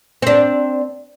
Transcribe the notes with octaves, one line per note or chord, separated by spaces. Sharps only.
C4 D4